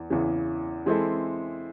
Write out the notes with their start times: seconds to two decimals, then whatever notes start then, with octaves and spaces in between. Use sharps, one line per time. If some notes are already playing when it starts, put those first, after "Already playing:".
Already playing: E2 E3
0.10 E2 C#3 E3
0.86 E3 G#3 C4 E4 A4